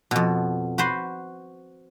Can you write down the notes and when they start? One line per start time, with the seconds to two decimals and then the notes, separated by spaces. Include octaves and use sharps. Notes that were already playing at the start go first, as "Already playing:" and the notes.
0.11 F2 B2
0.78 F#4 B4 C5